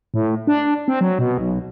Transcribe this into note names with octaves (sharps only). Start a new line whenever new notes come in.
A2
D4
C4
F#3
B2
B1